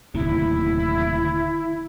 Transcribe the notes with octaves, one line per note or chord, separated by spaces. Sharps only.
D1 D#2 C3 E4